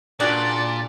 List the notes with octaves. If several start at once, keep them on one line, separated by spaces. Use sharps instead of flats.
A#2 D4 F#4 G#4 D5